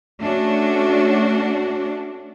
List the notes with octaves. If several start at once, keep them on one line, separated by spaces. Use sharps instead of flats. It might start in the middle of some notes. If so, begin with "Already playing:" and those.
A3 C#4 D4 F#4